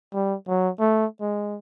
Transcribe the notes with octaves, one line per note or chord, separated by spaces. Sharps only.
G3
F#3
A3
G#3